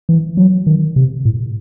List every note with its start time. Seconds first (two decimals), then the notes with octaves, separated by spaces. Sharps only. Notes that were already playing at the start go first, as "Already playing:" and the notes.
0.09 E3
0.37 F#3
0.67 D#3
0.96 C3
1.25 A2